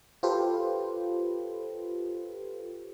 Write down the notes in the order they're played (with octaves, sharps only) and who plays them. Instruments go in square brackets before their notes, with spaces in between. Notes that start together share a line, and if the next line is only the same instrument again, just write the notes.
[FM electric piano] F4 G4 A4 B4 C5